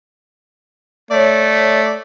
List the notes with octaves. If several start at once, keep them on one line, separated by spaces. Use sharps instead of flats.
A3 C#5 D5